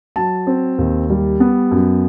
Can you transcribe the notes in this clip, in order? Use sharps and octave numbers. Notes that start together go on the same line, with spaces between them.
F#3 A5
C4
D#2
G3
B3
F#2